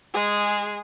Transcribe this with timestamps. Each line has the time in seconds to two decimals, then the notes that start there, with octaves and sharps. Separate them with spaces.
0.14 G#3 G#4